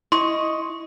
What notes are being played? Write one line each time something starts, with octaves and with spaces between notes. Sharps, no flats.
E4 D#5 C6 C#6